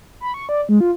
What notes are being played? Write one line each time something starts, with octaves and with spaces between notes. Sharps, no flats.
B5
C#6
D5
G#3
F4